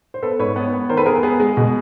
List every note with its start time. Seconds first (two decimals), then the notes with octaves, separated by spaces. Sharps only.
0.14 C5
0.23 B3 A4 B4
0.39 G#2 B4 C#5
0.56 B3
0.73 B3
0.89 D#3 A#4 C5
0.97 A4 B4
1.06 B3 G#4 A#4
1.23 B3 G#4
1.40 G#3
1.57 B2